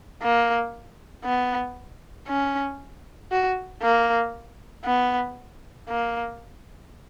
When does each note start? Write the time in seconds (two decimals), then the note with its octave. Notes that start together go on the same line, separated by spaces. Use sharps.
0.22 A#3
1.25 B3
2.28 C#4
3.31 F#4
3.82 A#3
4.85 B3
5.89 A#3